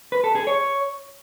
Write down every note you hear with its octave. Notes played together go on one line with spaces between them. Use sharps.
B4
A4
G#4
C#5